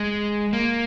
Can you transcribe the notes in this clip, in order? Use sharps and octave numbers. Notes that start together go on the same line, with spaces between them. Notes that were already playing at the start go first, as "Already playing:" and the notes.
Already playing: G#3
A#3